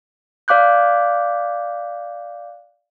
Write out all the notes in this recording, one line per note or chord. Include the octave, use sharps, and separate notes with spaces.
D5 F5 D6 F#6 G6